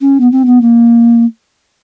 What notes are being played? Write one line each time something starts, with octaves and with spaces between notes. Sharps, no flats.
C#4
B3
C4
B3
A#3